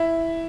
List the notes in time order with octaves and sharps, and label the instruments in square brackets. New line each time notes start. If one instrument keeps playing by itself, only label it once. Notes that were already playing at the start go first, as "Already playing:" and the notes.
Already playing: [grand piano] E4